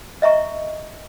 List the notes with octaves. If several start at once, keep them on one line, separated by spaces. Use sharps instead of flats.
D#5 E5 A#5 C#6